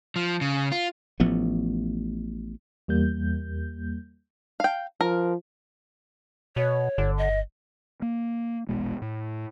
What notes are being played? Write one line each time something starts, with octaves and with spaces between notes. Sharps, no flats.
F3
C#3
F4
A1 F3 A3 B3
E2 G3 A#3 G6
F5 G5
F3 A#4
B2 C#5
G1 D3
D#5
A#3
E1 A#1 B2 G#3
A2